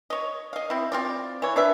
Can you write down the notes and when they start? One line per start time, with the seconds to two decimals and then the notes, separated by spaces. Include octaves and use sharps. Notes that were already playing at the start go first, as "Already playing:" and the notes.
0.10 C#5 D#5
0.53 D#5 F5
0.70 C4 E4
0.92 C4 F4 D5
1.42 E3 C#5
1.56 D4 B4 E5